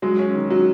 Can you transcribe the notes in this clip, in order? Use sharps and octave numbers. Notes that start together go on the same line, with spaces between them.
F#3 G#3
C#4
D#3
F#3